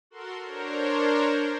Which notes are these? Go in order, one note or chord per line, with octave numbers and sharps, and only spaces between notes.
F#4 A4 A#4 C6
D4 A#4 C5 C#5